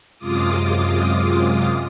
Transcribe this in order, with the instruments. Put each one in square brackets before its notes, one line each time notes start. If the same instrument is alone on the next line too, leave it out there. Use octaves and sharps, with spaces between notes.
[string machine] F#2 C3 G#3 F4 D6 D#6